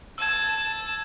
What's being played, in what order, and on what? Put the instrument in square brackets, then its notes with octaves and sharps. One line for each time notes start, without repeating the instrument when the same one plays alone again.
[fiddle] A5 [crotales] E6 G#6